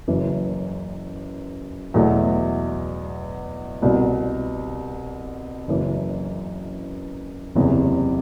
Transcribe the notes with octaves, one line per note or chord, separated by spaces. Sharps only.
F#1 F#2 E3
E2 B2 F#3 A3
C2 B2 G3
F#1 F#2 E3
F#1 E2 C3 G3